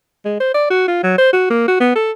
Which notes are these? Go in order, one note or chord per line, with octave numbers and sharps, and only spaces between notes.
G#3
C5
D5
F#4
F4
F#3
C5
F#4
A#3
F#4
B3
A4